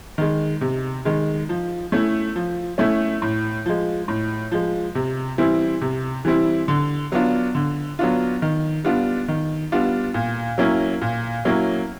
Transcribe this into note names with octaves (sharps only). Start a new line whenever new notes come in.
D#3 G#3
C3
D#3 G#3
F3
A3 C#4 E4
F3
A3 C#4 E4
A2
F3 G#3
A2
F3 G#3
C3
E3 G3 C4 E4
C3
E3 G3 C4 E4
D3
F#3 B3 D4 F4
D3
F#3 B3 D4 F4
D#3
G3 B3 D4 F4
D#3
G3 B3 D4 F4
A#2
F#3 A#3 C#4 E4
A#2
F#3 A#3 C#4 E4